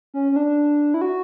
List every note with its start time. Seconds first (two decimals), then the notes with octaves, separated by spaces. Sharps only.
0.14 C#4
0.32 C#4
0.36 D4
0.94 E4
1.01 F#4